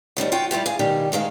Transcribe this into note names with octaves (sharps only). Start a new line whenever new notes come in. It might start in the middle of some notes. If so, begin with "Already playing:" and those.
D#2 D#3 G3 B3
F4 F#4 G5
G3 E4 F4 G4
G#4 F5
B2 D#3 G3 G4
D2 D#3 G#3 F5